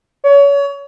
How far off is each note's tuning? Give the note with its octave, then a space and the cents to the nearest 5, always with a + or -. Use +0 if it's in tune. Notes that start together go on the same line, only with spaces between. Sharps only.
C#5 +30